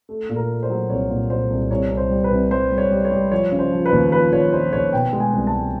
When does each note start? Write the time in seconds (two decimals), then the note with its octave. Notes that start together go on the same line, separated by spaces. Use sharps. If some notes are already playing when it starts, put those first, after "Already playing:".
0.09 A3
0.29 A#2
0.36 A#4
0.49 A3
0.63 C5
0.70 F#3
0.90 C2 C#5
1.10 A#2
1.30 A#2 C5
1.50 C2
1.71 C2 C#5
1.91 C2
1.97 C5
2.10 G3
2.24 B4
2.31 C2
2.51 G3 C5
2.71 G3
2.78 C#5
2.91 G3
3.05 C#5
3.12 G3
3.32 F3 C#5
3.52 C#3
3.59 C5
3.72 F3
3.85 B4
3.92 D#2
4.12 F3 B4
4.32 F3 C#5
4.52 F3 C5
4.73 D#2 C#5
4.93 B2 G5
5.13 G#3
5.20 G#5
5.33 C2
5.47 A5
5.54 G#3